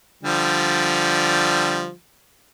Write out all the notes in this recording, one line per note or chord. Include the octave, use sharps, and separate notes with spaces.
D3 F3 G3